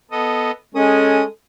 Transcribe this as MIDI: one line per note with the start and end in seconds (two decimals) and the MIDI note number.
0.11 0.51 59
0.11 0.51 69
0.11 0.51 75
0.75 1.24 56
0.75 1.22 61
0.75 1.29 69
0.75 1.24 87